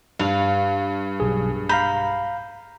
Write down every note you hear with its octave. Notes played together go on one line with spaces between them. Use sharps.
G2 F5 F7
B1 G#4
F5 A#5 B5 G6